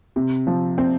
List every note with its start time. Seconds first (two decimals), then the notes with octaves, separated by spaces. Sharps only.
0.16 C3
0.47 F3
0.78 C4